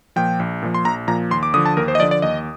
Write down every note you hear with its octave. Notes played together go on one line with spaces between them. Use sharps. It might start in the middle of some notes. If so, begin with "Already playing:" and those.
A#2 F3 G5
A#1
A#2 F3
C6
A#1 A#5
A#2 F3 A#5
D#2 C6
D6
D3 F3 D#6
A5
D#2 A#4
C5
D#5
D3 F3 D5
D5
D#2 D#5